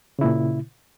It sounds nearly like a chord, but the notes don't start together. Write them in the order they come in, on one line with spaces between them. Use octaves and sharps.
C#3 E4 A#2